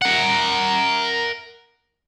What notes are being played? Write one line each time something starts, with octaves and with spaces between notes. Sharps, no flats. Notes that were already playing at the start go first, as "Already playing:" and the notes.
A#4 F#5